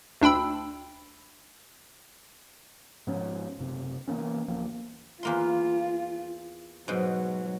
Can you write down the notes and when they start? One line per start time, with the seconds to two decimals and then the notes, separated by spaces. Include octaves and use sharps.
0.21 D2 D4 G5 B5 E6
3.07 G#2 F3 B3 C#4
3.58 F#1 C3
4.08 E3 A#3 B3 C#4
4.48 D1 F3 A#3
5.23 E2 A#3 F4 C6
6.88 G#2 B2 F#3